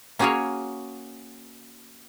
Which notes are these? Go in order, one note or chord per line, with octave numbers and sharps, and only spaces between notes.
A#3 C#4 F#4 G#4 A#4 C#5